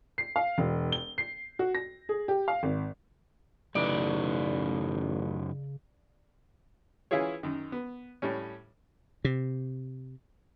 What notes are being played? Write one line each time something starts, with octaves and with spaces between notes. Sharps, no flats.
C7
F5
E1
G7
C7
F#4
A#6
G#4
G4
F5
G#1
A1 F#2 C#3 D#4 B4 D5
E3 C#4 E4 F4 G#4 C#5
F#2 D#3
B3
A2 G3 C#4
C3